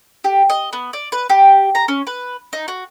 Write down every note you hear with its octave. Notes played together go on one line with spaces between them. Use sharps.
G4
D#5
B3
D5
B4
G4
A#5
C#4
B4
D#4
F#4